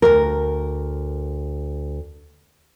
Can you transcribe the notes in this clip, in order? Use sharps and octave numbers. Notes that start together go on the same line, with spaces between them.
D2 A#4